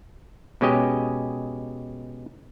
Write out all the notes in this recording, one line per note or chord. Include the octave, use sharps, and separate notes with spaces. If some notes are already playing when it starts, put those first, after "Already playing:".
B2 G#3 C#4 G4 D#5